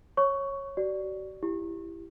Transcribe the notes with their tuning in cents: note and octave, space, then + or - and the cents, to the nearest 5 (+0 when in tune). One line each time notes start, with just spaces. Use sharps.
C#5 -15 C#6 +10
F#4 +40 D5 +0
E4 +15 G4 +5